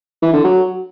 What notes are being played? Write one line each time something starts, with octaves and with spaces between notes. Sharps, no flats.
E3
D3
F#3